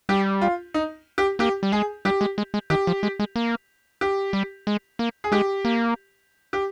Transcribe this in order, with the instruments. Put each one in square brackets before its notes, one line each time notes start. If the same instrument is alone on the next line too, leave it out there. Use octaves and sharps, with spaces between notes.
[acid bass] G3 [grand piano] G4
[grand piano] F4
D#4
G4
[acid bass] A#3 [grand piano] G4
[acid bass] G3
[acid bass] G#3 [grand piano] G#4
[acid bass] G3 [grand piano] G4
[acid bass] G#3
G#3
G#3
[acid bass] D#3 [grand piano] G4
[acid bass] F3
G#3
G#3
A#3
[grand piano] G4
[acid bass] G3
G#3
A#3
[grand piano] G#4
[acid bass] G#3 [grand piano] G4
[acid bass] A#3
[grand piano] G4